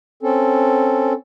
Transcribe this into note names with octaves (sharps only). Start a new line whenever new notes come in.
C4 C#4 A4